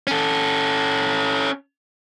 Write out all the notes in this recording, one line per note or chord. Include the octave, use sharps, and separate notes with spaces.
C#4 A4